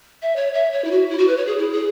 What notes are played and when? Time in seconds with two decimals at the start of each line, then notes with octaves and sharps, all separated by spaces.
0.22 E5
0.36 C#5
0.54 E5
0.72 C#5
0.84 E4
0.91 F#4
1.10 E4
1.18 F#4
1.28 B4
1.37 C#5
1.47 G#4
1.59 E4
1.72 G#4